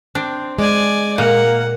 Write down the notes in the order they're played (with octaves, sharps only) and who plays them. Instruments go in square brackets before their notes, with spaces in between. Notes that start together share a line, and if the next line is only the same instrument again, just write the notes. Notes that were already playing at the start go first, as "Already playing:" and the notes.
[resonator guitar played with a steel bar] C4 [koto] D4
[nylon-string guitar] G#3 [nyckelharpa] D5 G#5
[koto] A#2 [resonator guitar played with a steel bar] A#3 [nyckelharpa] F#5